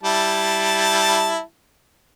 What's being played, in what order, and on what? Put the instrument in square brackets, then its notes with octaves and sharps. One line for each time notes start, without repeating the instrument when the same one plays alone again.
[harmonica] G3 E4 A5